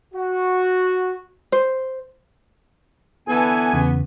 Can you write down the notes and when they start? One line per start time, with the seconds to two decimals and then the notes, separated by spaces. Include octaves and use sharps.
0.14 F#4
1.52 C5
3.28 D3 E3 B3 A4 G#5
3.73 E2 C#3